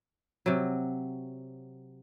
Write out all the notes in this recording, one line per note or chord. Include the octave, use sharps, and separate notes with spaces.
C3 F#3